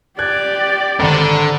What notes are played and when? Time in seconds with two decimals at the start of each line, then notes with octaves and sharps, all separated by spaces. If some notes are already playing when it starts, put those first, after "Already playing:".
0.19 G4 D5 F#6 G#6
1.00 G#1 D3